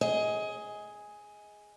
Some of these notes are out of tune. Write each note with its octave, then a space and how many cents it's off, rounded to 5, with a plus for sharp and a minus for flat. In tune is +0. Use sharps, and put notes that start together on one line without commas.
G#4 +0 D#5 +20